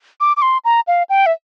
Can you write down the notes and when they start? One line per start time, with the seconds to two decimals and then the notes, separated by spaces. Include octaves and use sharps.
0.20 D6
0.37 D6
0.42 C6
0.65 A#5
0.87 F5
1.09 G5
1.26 E5